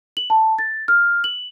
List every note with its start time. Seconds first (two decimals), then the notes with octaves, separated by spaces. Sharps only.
0.17 F#7
0.30 A5
0.59 A6
0.88 F6
1.24 F#7